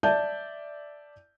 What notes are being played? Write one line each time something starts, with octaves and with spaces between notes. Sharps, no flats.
D5 E5 A5 G6